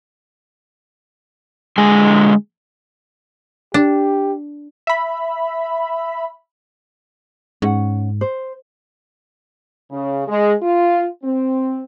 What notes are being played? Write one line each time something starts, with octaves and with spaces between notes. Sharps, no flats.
D3 G#3 G#4 G#5
D4 G4
E5 B5
G#2 C#4 F#5
C5
C#3
G#3
F4
C4